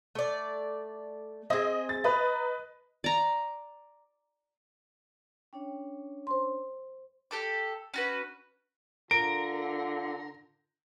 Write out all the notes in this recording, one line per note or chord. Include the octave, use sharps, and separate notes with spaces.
A3 D5
C4 G#4 D#5
A6
B4 D#5 A#5
D5 A#5
C#4 D4 C#5 G5
C5 C6
G4 A4 D6
C#4 F#4 B4
D3 F4 A#4 D7